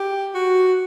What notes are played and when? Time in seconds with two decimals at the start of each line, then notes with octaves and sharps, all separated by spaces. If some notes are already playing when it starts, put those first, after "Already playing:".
Already playing: G4
0.34 F#4